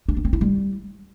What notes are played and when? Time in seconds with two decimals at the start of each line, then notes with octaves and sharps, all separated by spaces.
0.08 D4
0.17 B3
0.25 C4
0.33 E4
0.41 G3